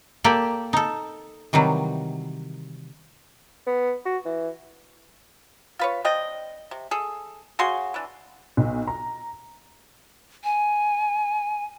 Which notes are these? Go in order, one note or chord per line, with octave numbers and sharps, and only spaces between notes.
A#3 G4 A4 D5
D#4 A4
C3 D#3 E3 F#3 G3
B3
F#4
E3
F4 B4 C#5
C4 D4 D#5 G5
C3
G#4 A4
C#3 F#4 G#4 C6
E3 D4
B1
A#5
G#5